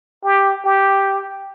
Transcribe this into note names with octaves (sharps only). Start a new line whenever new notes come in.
G4
G4